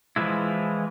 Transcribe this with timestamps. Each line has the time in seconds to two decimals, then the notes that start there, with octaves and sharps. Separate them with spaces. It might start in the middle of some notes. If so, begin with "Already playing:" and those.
0.16 E3 F3 G#3 E4